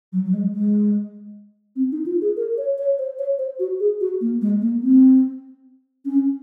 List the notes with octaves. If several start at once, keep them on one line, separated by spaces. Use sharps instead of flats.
F#3
F#3
G#3
G#3
C4
D#4
F4
G#4
A#4
C#5
C#5
C5
C#5
C5
F#4
G#4
F#4
A#3
G#3
A#3
C4
C#4